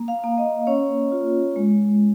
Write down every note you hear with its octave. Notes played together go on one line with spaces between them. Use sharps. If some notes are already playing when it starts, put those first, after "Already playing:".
Already playing: A#3
F5
A#3
D#5
C#4 C#5
F4
G#3